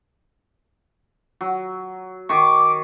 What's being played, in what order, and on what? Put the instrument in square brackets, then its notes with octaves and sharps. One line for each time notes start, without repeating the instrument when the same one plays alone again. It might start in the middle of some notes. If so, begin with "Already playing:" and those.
[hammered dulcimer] F#3
[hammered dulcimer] D#3 C#6 [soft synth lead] D6